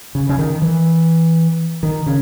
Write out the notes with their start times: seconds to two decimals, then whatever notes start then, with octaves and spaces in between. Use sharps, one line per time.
0.15 C#3
0.29 C#3
0.38 D#3
0.62 E3
1.83 D#3
2.06 C#3